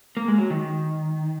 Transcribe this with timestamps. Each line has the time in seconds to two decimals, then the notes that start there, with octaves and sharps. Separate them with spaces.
0.17 A#3
0.28 G#3
0.38 F#3
0.50 D#3